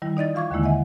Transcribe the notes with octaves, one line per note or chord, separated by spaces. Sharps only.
D#3 G3 E4
D#4 D5 D#5 A6
E3 F4 F5 C#6 D6 G#6
D#2 D3 D#3 G#3 A#3 E4
D#5 E5 F#5 G#5